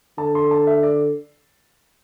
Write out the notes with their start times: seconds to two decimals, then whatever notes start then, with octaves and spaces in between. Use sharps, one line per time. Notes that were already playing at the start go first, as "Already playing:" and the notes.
0.18 D3 A5
0.35 C6
0.51 A5
0.67 E5
0.83 D5